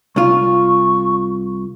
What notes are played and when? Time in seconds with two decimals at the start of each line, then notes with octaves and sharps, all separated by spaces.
0.16 C2 F4 C#6